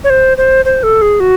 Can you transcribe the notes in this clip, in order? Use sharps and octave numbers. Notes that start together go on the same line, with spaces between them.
C#5
C5
C5
C5
A4
G#4
F#4